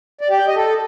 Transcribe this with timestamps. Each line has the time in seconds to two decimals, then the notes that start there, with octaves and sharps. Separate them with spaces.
0.21 D5
0.30 G4
0.39 G5
0.47 D#5
0.56 A4